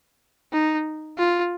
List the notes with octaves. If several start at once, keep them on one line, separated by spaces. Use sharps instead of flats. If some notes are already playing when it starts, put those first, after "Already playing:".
D#4
F4